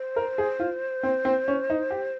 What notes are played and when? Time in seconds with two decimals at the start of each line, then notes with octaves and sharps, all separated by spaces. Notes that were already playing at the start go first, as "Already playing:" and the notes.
Already playing: C5
0.16 A#4
0.38 G#4
0.60 F4
1.03 C4
1.25 C4
1.48 C#4
1.70 D#4
1.91 G4